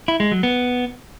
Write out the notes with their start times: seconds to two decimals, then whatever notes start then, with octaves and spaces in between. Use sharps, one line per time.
0.08 E4
0.20 G#3
0.32 F#3
0.43 B3